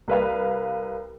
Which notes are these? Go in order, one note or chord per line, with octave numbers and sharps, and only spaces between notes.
C2 B4 F5